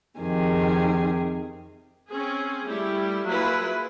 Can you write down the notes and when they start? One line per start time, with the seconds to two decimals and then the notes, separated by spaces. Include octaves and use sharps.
0.21 F2 C3 D#3 G#4
2.09 C4 C#4 G#4
2.66 G3 A3 E4
3.24 F#3 A#3 E4 F4 G#4 B4